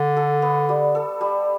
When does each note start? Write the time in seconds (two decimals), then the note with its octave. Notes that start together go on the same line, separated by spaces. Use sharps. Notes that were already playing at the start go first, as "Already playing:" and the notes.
Already playing: D3
0.17 A4
0.42 B3
0.69 G3
0.95 A4
1.21 G3